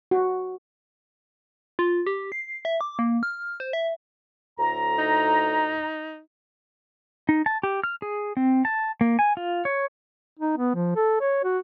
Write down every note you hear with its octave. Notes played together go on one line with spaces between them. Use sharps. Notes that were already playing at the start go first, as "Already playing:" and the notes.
F#4
F4
G4
C7
E5
D6
A#3
F6
C5
E5
D2 A2 A#5
D#4
D#4
A5
G4
F6
G#4
C4
A5
A#3
G#5
F4
C#5
D#4
B3
F3
A4
C#5
F#4